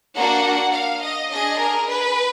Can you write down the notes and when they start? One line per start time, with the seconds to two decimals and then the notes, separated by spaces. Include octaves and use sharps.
0.15 A#3 D4 F#4 F#5
0.73 F5
1.02 D#5
1.31 D4 G#4 D#5
1.59 A#4
1.88 B4